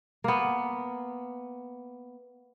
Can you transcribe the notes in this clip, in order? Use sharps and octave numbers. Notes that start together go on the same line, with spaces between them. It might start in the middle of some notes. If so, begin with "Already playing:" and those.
A#3 B3